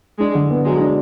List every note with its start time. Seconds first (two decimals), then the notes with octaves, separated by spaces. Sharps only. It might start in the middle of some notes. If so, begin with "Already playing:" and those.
0.19 G#3 D4
0.35 D3
0.50 B3
0.66 F#3 G#3
0.81 D4